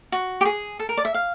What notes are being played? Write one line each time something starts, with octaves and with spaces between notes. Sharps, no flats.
F#4
G4
G#4
A4
A#4
D5
E5
F5